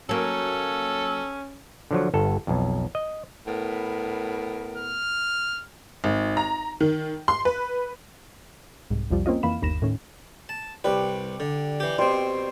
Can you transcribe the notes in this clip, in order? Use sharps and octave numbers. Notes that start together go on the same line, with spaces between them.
F#3 A#3 C#4 A4
D3 F3 F#3
G1 A4
B1 F2
D#5
A2 B3 A#4
F6
G#1
A#5
D#3
C6
B4
C2 G#2
C2 F2 F3 G3
A#3 C4 C#4 F4 D#5
F2 E3 A#3 F5 B5 E7
G1 D#2 B5 A#6 E7
A2 D#3 C#4
A5
C2 G3 B4
D3
E3 G4
B2 G3 C4 C5